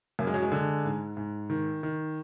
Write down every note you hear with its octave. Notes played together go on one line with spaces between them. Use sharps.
F#2 A#3
G#3
F#3
G#3
D3
G#2
G#2
D#3
D#3